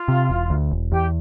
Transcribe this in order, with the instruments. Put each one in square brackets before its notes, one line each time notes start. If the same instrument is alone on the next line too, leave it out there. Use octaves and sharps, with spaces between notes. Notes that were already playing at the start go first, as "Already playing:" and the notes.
Already playing: [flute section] F4
[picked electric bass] C3
E1
D2
E1
[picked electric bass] E2 [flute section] G4